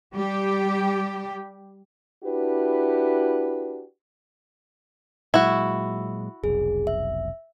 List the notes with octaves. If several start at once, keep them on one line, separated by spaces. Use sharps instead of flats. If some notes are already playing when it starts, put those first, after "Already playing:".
G3 G4
D4 E4 F#4 G4 B4
A#2 F#3 G#3 E4 F#4
F1 B1 G#4
E5